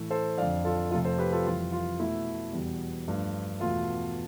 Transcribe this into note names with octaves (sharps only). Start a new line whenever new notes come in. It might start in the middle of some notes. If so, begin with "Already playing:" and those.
Already playing: A2 E3 A3
A4 C5
F2 D3 F3 D5 F5
F4 A4
F2 C3 F3 A3 F4 A4
A4 C5
G4 B4
F4 A4
F2 E3 G3 F4
F4
B2 A3 E4
E2 B2 G3
G2 F3 A3
E2 B2 A3 F4